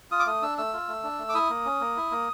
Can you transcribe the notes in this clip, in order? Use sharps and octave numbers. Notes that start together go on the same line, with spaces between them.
F4 D#6
D6
A3 D#6
D4 E6
A3 E6
F4
A3
D4
A3
D6
E4 D#6
A#3
C#4
A#3
E4
A#3